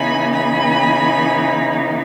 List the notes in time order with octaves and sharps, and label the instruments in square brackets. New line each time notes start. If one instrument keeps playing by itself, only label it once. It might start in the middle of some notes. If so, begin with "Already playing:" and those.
Already playing: [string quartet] C#3 E3 B3 D#4 G#5 B5
G#5 B5